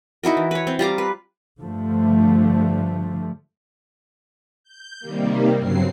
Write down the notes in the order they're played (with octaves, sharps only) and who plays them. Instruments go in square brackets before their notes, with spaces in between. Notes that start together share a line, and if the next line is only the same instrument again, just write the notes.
[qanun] D#4 E4 F#4 A#4
E3
B4 C#5
C4
G3 F4 A#5 D6
B4
[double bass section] G2 D3 F3 A3
[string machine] G6
C3 D#3 G3 A#3
G2 C#3 F#3 C4 C7